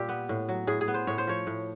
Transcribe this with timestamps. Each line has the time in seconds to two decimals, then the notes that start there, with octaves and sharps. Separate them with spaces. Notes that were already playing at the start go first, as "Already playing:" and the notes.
Already playing: A#2 G3 G4
0.09 B3
0.29 A2
0.49 F#3
0.67 A2 G#4
0.81 G#4
0.88 B3
0.94 C5
1.07 A2 C#5
1.18 C5
1.27 F3 C#5
1.47 A2